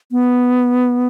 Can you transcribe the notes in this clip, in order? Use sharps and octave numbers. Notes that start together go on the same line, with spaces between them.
B3